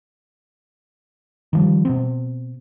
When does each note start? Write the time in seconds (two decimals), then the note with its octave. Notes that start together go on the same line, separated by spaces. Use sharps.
1.53 D#3 F3 G3
1.85 B2 B3 C4